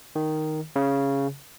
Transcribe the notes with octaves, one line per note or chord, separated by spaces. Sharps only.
D#3
C#3